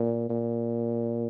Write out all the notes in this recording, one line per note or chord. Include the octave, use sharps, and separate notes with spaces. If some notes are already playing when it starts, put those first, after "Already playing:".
Already playing: A#2
A#2